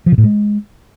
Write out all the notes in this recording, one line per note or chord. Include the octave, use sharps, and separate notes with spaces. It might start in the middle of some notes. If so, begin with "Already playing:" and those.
F3
C3
A2
G#3